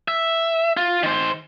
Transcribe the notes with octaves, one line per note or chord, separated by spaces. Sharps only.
E5
F4
D#3 C5